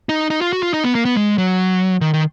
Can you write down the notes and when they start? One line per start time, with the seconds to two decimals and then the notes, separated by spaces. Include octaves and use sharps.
0.09 D#4
0.30 D#4
0.41 F4
0.53 F#4
0.63 F4
0.74 D#4
0.84 B3
0.95 A#3
1.05 B3
1.16 G#3
1.38 F#3
2.01 D#3
2.14 D#3